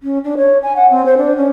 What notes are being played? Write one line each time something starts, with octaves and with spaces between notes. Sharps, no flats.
C#4
D4
C#5
G#5
F#5
C4
C5
D4
C#4